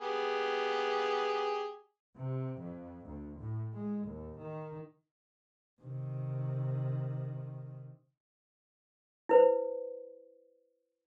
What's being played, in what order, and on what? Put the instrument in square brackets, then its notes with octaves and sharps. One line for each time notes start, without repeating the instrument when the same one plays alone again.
[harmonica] B3 G4 G#4
[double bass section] C3
F2
D2
A2
G#3
D#2
D#3
[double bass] C3 D#3
[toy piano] E4 B4 C5